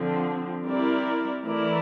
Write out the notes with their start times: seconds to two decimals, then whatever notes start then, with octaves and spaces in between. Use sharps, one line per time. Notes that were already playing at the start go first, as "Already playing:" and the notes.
Already playing: D3 F3 C4
0.64 G3 C4 E4 A#4 D5
1.45 E3 A3 E4 A#4 D5